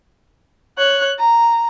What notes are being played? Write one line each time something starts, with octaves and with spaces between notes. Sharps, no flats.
C#5 F#6
A#5